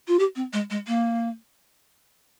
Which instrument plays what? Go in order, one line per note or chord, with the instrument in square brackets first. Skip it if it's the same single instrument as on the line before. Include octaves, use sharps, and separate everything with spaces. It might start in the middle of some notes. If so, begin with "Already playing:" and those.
[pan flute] F4
G4
C4
G#3
G#3
A#3